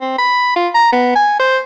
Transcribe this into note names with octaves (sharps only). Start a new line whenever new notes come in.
C4
B5
F4
A#5
B3
G#5
C5